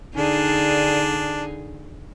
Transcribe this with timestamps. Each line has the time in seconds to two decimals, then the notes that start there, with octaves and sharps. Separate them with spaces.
0.15 D3 D4 D#4 G#4